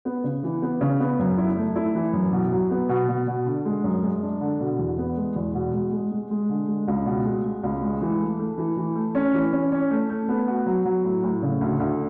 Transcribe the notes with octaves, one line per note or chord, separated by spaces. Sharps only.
B3
C#3
E3
B3
C#3
B3
F#2
E4
A3
E4
E3
F#2
B2
F#3
B3
B2
B2
B2
D3
G#3
F#2
G#3
D4
D3
B2
E2
B3
G#3
E2
B2
G#3
G#3
G#3
G#3
D3
G#3
C#2
B2
G#3
G#3
C#2
G#3
E3
A3
A3
E3
E3
A3
C#4
E3
C#4
C#4
A3
A3
B3
F#4
F#3
F#3
A2
A2
C#3
D2
D2